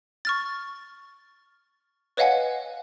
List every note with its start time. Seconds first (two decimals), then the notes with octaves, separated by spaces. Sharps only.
0.25 C#6 F6 A6
2.17 B4 C#5 D#5 F5 F#5 G#5